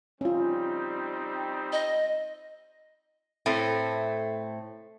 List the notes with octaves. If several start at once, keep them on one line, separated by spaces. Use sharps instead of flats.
G3 C4 C#4 D#4 F4
D#5
A2 A3 C4